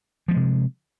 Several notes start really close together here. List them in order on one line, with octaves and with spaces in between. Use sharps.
F3 A#3 G#3 C3